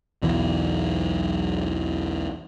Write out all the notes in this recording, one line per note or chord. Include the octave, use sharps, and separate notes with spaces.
B1 E2 E3